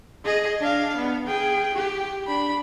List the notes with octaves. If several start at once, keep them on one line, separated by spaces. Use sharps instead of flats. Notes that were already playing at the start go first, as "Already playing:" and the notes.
G#4 D#5
D4 F5
B3
G#4 G5
G4
D4 B5